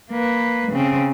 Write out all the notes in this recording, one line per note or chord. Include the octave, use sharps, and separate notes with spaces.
A#3 B4
C#3 C4